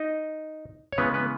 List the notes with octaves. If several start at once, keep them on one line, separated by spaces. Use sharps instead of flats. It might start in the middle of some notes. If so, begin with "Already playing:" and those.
Already playing: D#4 D#5
C#5
C#3 E3 G#3 B3 C#4 B4
B3 B4